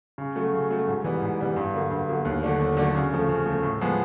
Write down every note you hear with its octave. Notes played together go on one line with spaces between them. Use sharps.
C#3
F#3 A3
C#3
F#3 A3
G#2
E3 G3 B3
G#2
E3 G3 B3
G2
D3 F#3 A#3
G2
D3 F#3 A#3
D#2
D3 F#3 A3 D4
D#2
D3 F#3 A3 D4
C#3
F3 A3
C#3
F3 A3
A2
F3 G#3 B3